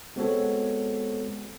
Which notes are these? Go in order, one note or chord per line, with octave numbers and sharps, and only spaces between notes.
G#3 B3 C4 F#4 A4 C#5